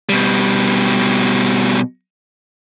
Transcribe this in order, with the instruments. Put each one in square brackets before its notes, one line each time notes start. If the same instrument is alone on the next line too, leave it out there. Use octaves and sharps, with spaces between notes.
[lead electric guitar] B2 G3